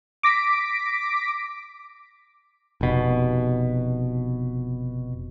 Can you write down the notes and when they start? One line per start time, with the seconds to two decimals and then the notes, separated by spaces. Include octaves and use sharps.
0.23 D6 A#6 B6 D7
2.81 F1 B2